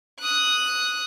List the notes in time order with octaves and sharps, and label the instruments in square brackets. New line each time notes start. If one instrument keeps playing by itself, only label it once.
[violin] D#6 F#6